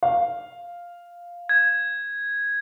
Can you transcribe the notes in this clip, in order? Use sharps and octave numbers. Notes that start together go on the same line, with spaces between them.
F5
G#6